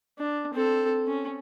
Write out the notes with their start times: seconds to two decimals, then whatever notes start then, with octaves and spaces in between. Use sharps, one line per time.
0.18 D4
0.54 C4 A4
1.07 C#4